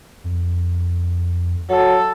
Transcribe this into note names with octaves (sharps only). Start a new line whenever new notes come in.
F2
F#3 A4